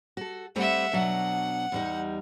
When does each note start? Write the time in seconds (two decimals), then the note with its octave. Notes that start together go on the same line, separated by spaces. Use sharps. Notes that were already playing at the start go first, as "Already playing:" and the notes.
0.17 F#4 A4
0.56 G3 A3 C4 E5 F#5
0.93 B2 F#3 D4 F#5
1.72 E2 G3 D#4